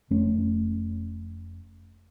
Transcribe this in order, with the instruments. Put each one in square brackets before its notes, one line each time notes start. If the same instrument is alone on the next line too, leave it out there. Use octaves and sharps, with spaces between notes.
[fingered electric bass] F1 A3 C#4